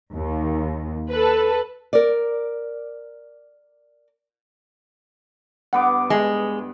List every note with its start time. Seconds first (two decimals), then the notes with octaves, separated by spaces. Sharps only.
0.14 D#2
1.10 A4 B4
1.93 A#4 D5
5.73 G2 B3 F#5 D6
6.10 G#3